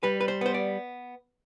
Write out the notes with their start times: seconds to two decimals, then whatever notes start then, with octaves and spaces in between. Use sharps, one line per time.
0.03 G3 B4
0.21 B4
0.28 C5
0.41 B3 C5
0.54 D5